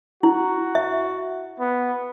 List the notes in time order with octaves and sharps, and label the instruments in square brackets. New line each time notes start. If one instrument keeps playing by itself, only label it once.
[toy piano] E4 [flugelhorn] F#4
[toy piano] E5
[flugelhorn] B3